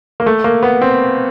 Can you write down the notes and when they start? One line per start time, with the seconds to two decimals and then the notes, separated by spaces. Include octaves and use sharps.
0.20 A#3
0.26 A3
0.44 A#3
0.63 B3
0.82 C4